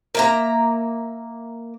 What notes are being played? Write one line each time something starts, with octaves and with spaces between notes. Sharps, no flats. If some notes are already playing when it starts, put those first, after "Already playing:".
A#3 E5 A#5